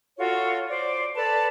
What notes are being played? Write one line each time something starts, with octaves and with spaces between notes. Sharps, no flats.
F4 F#4 A4 C#5
C5 D5
A4 B4 D5 A5